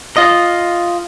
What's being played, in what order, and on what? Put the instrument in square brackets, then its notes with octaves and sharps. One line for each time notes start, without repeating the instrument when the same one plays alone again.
[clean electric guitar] F4 D#5